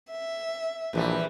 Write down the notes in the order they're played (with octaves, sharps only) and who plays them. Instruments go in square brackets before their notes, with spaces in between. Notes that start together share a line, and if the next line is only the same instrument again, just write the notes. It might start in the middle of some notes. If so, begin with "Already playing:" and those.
[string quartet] E5
[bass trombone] A#1 [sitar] E2 E3 G3